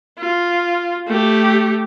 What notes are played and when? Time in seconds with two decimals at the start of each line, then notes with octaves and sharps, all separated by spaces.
0.19 F4
1.07 A3 G4